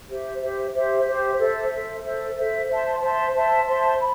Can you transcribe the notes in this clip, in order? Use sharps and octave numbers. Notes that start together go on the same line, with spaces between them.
G4 C5 E5
G4 C5 E5
G4 C5 E5
G4 C5 E5
A4 C5 E5
A4 C5 E5
A4 C5 E5
A4 C5 E5
C5 E5 A5 C6
C5 E5 A5 C6
C5 E5 A5 C6
C5 E5 A5 C6
B5